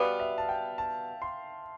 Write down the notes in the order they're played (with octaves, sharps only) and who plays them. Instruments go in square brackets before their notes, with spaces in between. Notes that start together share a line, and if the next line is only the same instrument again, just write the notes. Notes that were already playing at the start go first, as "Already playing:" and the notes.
Already playing: [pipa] B2 G3 B3 [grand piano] F5
[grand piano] E5
A5
G5
A5
C6